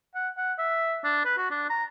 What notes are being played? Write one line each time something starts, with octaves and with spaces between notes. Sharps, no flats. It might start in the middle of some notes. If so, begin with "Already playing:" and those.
F#5
F#5
E5
D4
B4
F#4
D4
A#5